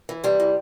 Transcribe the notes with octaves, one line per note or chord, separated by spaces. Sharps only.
E3
C3 G3
E3